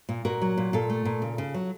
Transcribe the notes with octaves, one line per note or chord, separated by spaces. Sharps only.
A#2
A#2 F#4 A#4
F#3
A#2
A#2 F4 A4
A3
A#2
C#3
C#3
F#3